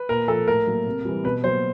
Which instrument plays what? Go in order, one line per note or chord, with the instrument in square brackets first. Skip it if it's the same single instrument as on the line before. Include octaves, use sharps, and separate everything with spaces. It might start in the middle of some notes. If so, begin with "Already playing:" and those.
Already playing: [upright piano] B4
[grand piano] A#2 [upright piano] A#4
[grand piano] F3 A#3 [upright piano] A4
[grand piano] A2 [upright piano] A#4
[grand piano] F#3 A#3
C3
E3 G3
[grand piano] B2 [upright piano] B4
[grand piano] F#3 A#3 [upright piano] C5